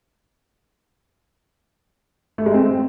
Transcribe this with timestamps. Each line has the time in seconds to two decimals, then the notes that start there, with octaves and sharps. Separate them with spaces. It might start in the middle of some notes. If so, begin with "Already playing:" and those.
2.38 A3
2.46 G#3
2.54 C4